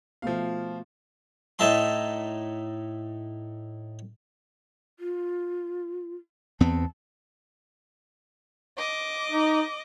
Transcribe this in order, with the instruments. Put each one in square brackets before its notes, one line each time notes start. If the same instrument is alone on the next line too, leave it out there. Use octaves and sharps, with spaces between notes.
[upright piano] B2 A3 F4 [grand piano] F3 F5
[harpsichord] A2 D#4 E5 A5 C6
[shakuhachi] F4
[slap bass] E2 B3 C4 [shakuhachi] A5
[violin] D#5 D6
[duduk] D#4